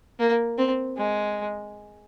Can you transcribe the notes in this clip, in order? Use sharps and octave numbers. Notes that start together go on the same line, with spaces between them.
A#3
C4
G#3